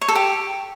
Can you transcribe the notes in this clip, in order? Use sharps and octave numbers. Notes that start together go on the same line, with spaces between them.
C#5
A4
G4